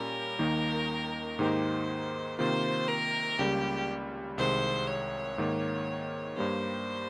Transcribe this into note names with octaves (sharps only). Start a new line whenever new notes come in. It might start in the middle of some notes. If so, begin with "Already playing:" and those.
Already playing: A#2 G3 C#4 A#4
D#2 D#3 A#3 D#4
G#2 D#3 A#3 D#4 G4 C5
C3 D#3 A#3 F4 C5
A#4
C#2 C#3 G3 A#3 G4
C2 C3 D#3 G#3 C5
C#5
G#2 D#3 A#3
G2 G3 A#3 C5